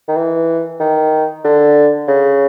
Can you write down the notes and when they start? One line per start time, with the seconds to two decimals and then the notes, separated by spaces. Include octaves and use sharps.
0.09 D#3
0.17 E3
0.80 D#3
1.45 D3
2.08 C#3